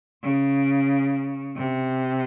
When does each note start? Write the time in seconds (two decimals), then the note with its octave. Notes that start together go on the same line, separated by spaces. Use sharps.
0.23 C#3
1.57 C3